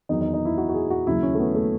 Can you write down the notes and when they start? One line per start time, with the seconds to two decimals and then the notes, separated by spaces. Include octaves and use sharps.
0.09 E2 D#3 F#3 D#4
0.21 D#4
0.34 D#4
0.45 E4
0.58 F#4
0.69 F#4
0.74 G#4
0.90 F#4
1.07 D#2 C#3 F#3 E4
1.23 C#4
1.35 A3
1.39 B3
1.55 A3